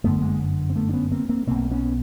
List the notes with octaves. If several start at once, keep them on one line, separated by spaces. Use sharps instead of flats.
G1 F#2 D3 A3 B3
G#3 A#3
C4
A3 B3
D4
B3 C#4
A#3 C4
A#3 C4
B1 B2 A#3 C4
B3 C#4